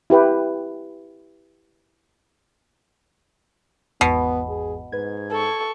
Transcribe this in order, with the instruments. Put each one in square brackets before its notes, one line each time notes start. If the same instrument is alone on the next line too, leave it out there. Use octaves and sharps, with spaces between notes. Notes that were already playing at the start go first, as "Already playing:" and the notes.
[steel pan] E4 G4 B4 G5
[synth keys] G#1 E2 G#2 [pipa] B2 [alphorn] B3
[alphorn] G#4
[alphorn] G#2 [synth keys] B4 G#6
[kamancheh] A4 C#6